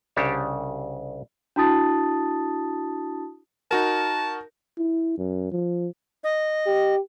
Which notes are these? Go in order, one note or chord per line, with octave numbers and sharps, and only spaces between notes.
C2 C#3 D4 G4 C#5 A5
D4 E4 F#4 A5 D#6 A6
D#4 F#4 A#4 A5
E4
F#2
F3
D#5
G4